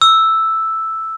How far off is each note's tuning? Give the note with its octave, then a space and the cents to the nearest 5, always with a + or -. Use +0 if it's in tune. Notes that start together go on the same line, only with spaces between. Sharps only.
E6 +0